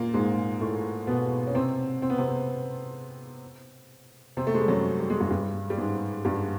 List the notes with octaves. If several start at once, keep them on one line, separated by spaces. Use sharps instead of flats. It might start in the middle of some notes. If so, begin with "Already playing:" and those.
Already playing: A#2 A#3
G#2 G#3
A2 A3
B2 B3
C#4
C3 C4
C4
B3
C3 C4
C3 C4
A3
G#3
G3
F#2 F#3
G3
G#3
G2 G3
G2 G3
G3
G#2 G#3
G2 G3